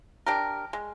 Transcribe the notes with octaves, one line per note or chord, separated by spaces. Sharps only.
D4 G4 A#4
G#3